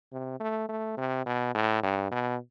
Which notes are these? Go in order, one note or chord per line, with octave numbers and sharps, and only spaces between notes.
C3
A3
A3
C3
B2
A2
G2
B2